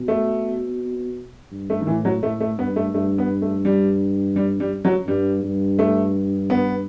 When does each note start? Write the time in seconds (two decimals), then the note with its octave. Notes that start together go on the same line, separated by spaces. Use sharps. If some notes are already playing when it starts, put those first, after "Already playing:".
Already playing: B2
0.08 A3
1.51 G2
1.70 A3
1.81 D#3
1.87 A2 E3
2.05 F#3
2.23 A2 A3
2.40 A3
2.58 G2 B3
2.76 A3
2.94 G2 A3
3.18 B3
3.42 A3
3.65 G3
4.36 G3
4.60 G3
4.85 F#3
5.07 G2 G3
5.44 G2
5.79 A3
6.50 B3